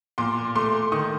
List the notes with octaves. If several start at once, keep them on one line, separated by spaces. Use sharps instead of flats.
A#2 C6 D6
A3 C6 D6
D#3 C#6 D#6